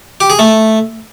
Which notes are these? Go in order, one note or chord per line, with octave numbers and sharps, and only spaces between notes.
G4
G#4
A3